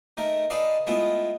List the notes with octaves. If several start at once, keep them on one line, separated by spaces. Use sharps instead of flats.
D#3 A3 A#4
D#4 G#4 A4 B4 D5 F5
G#3 A3 B3 E4 F4